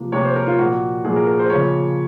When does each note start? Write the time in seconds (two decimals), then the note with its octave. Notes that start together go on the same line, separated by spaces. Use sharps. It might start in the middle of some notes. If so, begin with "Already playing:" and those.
Already playing: C3 F3 A#3
0.12 C3 F3 A#3 C#5
0.25 C5
0.36 A#4
0.47 F4
0.58 A#2 F3 A#3 F#4
1.04 A#2 F3 A#3 G#4
1.16 A#4
1.27 A#4
1.39 C5
1.50 C#3 F3 A#3 C#5